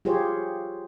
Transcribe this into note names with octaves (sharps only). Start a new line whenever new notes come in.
F4 G4 G#4 C5 C#5